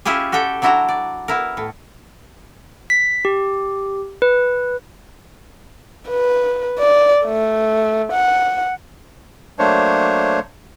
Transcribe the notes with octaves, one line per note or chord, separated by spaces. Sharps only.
C#4 E4 F4 G4 G#4
F#4 G4 A4 G5
F#3 D4 E4 F#4 F#5 A#5
D5
B3 E4 A#4
A2
B6
G4
B4
B4
D5
A3
F#5
F#3 A3 A#3 D4 C5 C#5